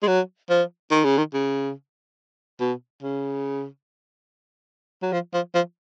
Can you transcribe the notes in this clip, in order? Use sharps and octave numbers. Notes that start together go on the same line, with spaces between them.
G#3
F#3
F3
D#3
C#3
D#3
C#3
B2
C#3
F#3
F3
F3
F3